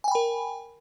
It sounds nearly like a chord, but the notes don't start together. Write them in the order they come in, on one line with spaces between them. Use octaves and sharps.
G#5 G5 B5 A#4